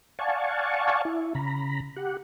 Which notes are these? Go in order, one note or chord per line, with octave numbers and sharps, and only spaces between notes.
D5 F5 F#5 G#5 A5 C#6
E4
C#3 A#5 B5
G4 F#5